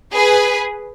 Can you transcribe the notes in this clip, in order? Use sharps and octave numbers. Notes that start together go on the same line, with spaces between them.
G#4 B4